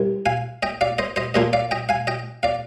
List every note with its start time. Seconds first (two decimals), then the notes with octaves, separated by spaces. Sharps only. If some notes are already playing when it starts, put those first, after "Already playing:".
Already playing: C2 C3 D#3
0.26 F5 G#5
0.63 D#5 G5
0.81 D5 F5
0.98 C5 D#5
1.16 C5 D#5
1.34 A#2 F3 A#3 C5 D#5
1.53 D5 F5
1.71 D#5 G5
1.89 F5 G#5
2.07 D#5 G5
2.43 D5 F5